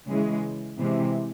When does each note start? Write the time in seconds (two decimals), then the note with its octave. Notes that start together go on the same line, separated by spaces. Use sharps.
0.09 C#3 E3 G#3
0.79 C3 E3 G#3 C4